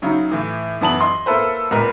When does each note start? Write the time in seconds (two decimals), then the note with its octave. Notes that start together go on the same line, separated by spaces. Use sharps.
0.02 C#3 F#3 D#4 E4
0.31 A2 E3
0.81 F#2 E3 B3 A5 D#6 F#7
1.01 D#5 C6
1.26 A#3 E4 A4 B4 C5
1.71 C#2 A#2 A#4 B4